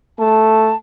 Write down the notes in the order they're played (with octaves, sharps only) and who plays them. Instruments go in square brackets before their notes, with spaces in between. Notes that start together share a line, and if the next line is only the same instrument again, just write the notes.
[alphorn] A3 [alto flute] A5